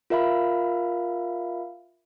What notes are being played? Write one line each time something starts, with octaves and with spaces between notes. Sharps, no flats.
F4 A#4 E5 F5 B5